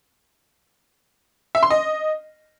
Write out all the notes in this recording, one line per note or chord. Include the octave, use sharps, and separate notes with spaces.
E5
C6
D#5